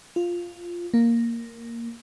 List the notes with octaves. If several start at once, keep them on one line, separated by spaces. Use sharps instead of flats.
F4
A#3